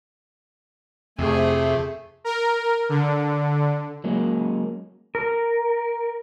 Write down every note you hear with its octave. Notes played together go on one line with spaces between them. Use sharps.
F2 C3 A3 G#4
A#4
D3
F#3 G#3 A#3 C#4
A#4